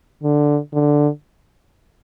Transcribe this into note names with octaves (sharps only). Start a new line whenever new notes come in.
D3
D3